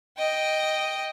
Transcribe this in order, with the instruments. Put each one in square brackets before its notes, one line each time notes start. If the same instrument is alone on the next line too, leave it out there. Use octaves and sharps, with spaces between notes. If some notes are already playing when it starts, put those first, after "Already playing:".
[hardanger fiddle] D#5 G5